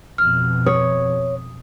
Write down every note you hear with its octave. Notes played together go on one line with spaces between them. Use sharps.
F2 B2 F6
C#5 D#6